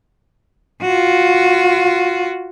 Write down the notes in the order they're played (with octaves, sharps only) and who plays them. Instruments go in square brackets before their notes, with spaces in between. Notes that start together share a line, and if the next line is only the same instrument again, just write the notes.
[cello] F4 F#4